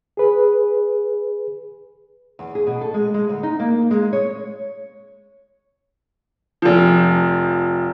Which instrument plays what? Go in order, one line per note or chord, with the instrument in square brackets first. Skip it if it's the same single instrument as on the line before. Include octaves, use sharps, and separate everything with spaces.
[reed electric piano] G#4 B4
[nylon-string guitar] E2
G#4
B2
A4
G#3
G#3
D2
D#4
A#3
G#3
C#5
[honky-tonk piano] F1 F3